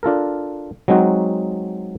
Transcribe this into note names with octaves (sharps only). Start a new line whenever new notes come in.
D4 F4 A4 A#4
F#3 G#3 C4 D#4 F#4